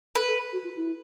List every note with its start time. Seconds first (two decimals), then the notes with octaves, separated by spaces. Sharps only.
0.15 A4 B4
0.28 A4
0.52 F#4
0.64 F4
0.76 E4